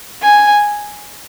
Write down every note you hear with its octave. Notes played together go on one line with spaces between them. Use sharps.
G#5